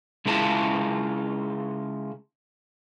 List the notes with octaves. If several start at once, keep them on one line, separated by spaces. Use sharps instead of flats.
C#3 G#3 E4 F4 G#4 A5